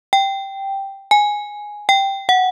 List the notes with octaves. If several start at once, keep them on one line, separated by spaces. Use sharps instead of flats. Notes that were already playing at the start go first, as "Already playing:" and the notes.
G5
G#5
G5
F#5